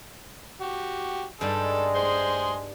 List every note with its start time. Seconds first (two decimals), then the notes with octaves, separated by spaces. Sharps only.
0.61 F#4 G4
1.41 G2 G3 G#3 D#4 A4
1.95 G#4 C5 C6